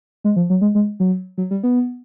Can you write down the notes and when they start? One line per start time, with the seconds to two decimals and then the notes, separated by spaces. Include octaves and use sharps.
0.24 G#3
0.36 F3
0.50 F#3
0.61 G#3
0.75 G#3
1.00 F#3
1.38 F#3
1.51 G3
1.63 B3